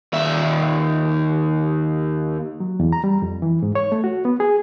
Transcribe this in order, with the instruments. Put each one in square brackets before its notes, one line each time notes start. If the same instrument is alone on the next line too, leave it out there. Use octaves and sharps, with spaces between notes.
[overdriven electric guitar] D#2 E5
[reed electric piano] F#3
E2
A#5
G3
F2
E3
G#2
C#5
A3
F#4
B3
G#4